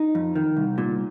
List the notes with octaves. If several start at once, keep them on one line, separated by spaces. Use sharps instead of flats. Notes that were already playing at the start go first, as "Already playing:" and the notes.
Already playing: D#4
F2
D#3
C2
A#2